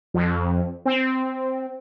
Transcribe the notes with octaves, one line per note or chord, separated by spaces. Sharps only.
F2
C4